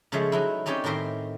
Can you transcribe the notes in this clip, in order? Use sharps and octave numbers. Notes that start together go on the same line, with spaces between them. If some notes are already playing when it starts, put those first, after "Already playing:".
C#3 F3 G#3 A3 C#5 E5
F#3 D#4 E4
C4 C#4 D#4 G4 C#5 D5
A2 D#3 C4 A#4 E5 C6